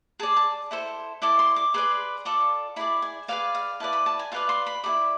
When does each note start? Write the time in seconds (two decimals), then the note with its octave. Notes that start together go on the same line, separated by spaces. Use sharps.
0.19 G#4 D5 A5
0.36 A5
0.71 E4 A4 C5
1.22 E4 A4 D5 D6
1.39 C6
1.56 D6
1.74 G#4 B4 D5 C6
2.25 F4 A4 D5
2.76 E4 G#4 D5 B5
3.02 G#5
3.28 G#4 B4 D5 F5
3.55 F5
3.80 E4 B4 D5 A5
3.93 B5
4.06 A5
4.19 G#5
4.32 F4 B4 D5 F5
4.49 C6
4.67 B5
4.84 E4 G#4 D5 B5